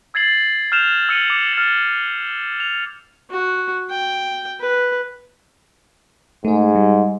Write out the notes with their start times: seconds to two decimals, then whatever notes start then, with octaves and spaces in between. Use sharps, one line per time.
0.14 E6 G#6 A6 C7 F#7
0.72 F6 G6 E7 F7
1.09 E6 C#7 D#7
1.28 D6 C#7
1.53 F6 A6
2.60 F7
3.30 F#4
3.90 G5
4.60 B4
6.45 G#2 A3 G#4
6.75 G3